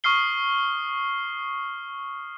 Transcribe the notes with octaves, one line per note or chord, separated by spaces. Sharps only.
C#6 D#6 F6 C7 G7